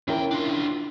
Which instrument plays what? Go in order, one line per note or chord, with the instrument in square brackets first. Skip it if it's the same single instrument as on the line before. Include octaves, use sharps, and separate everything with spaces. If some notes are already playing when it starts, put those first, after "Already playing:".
[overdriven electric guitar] E2 G5 [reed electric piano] C#4 E4 A#4
[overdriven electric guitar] D4 F4